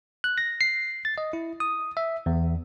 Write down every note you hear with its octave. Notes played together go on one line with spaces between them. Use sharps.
F#6
A#6
C7
A6
D#5
E4
D#6
E5
E2